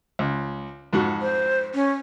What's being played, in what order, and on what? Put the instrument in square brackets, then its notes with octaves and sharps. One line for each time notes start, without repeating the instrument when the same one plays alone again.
[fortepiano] C#2
F2 G#2 F#4
[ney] C5
C#4